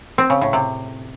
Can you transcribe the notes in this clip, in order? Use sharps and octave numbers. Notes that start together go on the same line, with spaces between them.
C4
C#3
A2
C3